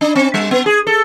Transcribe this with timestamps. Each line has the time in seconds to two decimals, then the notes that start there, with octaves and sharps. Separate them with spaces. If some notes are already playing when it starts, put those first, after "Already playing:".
0.01 D4
0.15 C4
0.34 G3
0.51 B3
0.66 G#4
0.87 A4